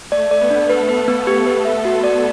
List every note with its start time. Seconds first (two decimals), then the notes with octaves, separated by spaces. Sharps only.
0.12 A3 D5
0.31 D5
0.41 B3
0.50 D4
0.70 A4 B4
0.89 B4
1.08 B3
1.27 G4
1.46 B4
1.65 E5
1.85 F#4
2.04 D5